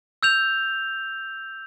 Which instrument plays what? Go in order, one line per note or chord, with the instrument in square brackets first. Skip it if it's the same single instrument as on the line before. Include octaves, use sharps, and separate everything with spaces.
[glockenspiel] E6 G6 F7